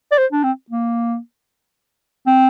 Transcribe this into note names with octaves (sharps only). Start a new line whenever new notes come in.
D5
C5
D4
C4
A#3
C4